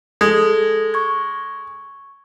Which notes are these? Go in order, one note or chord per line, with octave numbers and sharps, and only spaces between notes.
G#3 A4
C#6 G#6